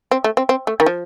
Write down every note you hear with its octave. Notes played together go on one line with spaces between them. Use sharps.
C4
A3
C4
C4
A3
D#3
F3